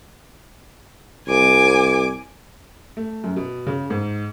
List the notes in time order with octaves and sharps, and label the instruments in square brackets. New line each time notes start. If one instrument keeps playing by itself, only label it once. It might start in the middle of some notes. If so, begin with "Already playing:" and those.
[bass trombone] C2 [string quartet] G#5 D6
[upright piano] A3
F#2
B2
C#3
G#2